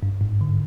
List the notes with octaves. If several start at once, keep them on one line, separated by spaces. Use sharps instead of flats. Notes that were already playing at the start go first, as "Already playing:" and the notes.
G2
G#2
D3